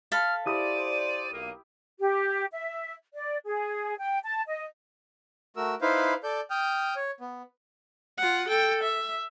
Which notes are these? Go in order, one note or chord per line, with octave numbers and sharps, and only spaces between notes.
A4 F5 B5 F6
E4 G4 C5 D5 D#6 D#7
B1 A#3
G4
E5
D5
G#4
G5
A5
D#5
A3 F#4 A#4 E6
D#4 E4 B4 C5 F5
A4 D5 G6
G5 D#6 F6 G6
C#5
B3
F4 F#5
A4 G5
E5